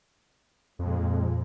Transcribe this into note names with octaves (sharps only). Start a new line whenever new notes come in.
F2 A#2 G#3